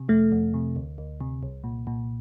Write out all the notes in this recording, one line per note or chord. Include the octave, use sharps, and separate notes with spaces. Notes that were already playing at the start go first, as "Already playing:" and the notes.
Already playing: C3
F2 A3
F2
C3
D2
D2
C3
C2
A#2
A#2